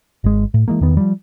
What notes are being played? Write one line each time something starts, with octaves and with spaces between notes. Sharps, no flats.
G#1 G#3
A2
E3 G#3 A#3
E2 D#3 B3
F3 G3